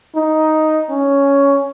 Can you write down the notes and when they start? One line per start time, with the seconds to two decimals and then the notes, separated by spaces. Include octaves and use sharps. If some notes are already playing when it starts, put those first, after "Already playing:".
0.16 D#4
0.90 C#4